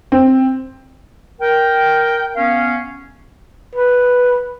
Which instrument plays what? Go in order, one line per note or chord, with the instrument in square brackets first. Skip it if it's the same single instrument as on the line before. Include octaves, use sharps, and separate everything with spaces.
[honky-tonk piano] C4
[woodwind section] A#4 G5
B3 C#4 F5
[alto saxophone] B4